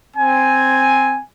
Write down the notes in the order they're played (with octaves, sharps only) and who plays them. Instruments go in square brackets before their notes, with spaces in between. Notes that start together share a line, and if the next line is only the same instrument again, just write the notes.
[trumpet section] C4 G#5